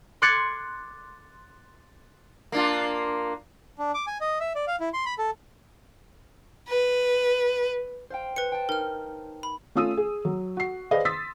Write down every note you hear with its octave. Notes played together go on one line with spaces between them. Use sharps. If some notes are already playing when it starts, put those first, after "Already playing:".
C6 D6 F#6 G#6 A6 C#7
A#3 D4 F4
D4
D6
G#5
D#5
E5
D5
F5
E4
C6
B5
A4
B4
C5 F5 G5
B4 C5 C#7
G5 A5
D#4 A#4 F6
B5
A3 C#4 F4 D#6 E6 D#7
G#4
F#3
F#4 C7
G#4 B4 C5 D5 D#5 F5
C6 D#6 E6 A6 B6